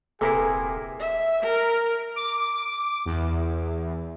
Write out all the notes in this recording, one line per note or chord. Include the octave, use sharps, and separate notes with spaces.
D#1 C3 A#3 E4 G#4 A4 B4 G#5
E5
A#4
D6
E2